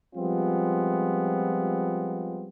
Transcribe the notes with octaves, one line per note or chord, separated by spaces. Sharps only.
F3 G3 G#3 B3 C4 F4